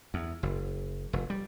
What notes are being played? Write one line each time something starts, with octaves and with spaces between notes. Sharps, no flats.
E2
F#1
F1
G3